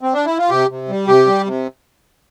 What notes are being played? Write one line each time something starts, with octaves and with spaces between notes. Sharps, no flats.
C4
D4
E4
F4
C3 G4
C3
G3
C3 G4
G3
C3